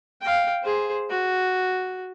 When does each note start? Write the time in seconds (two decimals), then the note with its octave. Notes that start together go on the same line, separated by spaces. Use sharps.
0.21 F5 G5
0.62 G#4 C5
1.10 F#4